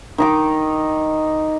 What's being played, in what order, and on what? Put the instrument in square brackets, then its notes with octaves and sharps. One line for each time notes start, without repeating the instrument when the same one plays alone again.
[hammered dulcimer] D#3 D#4 D6